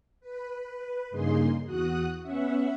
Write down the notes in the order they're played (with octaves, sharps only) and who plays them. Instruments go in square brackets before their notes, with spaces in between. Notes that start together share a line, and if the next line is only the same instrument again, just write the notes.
[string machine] B4
G2 C#3 A#3 D#4 G#4 C6
E2 F#4 D#6 F#6
B3 C#4 E5 F#5